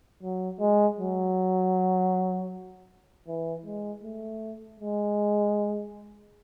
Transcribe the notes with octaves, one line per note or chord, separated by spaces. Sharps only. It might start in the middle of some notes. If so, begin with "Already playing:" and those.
F#3
G#3
F#3
E3
G#3
A3
G#3